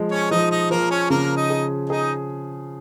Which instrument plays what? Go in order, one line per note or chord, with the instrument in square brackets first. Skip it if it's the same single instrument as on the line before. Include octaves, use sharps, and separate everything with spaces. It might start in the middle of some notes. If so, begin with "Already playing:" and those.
Already playing: [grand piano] F3 G#3
[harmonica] C#4 C#5
[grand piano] F3 [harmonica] D#4 D#5
[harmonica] D#4 D#5
[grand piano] F3 [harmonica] A#3 A#4
[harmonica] C#4 C#5
[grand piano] C#3 [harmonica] A#3 A#4
[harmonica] D#4 D#5
[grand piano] G#4
[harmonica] D#4 D#5 [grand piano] G#4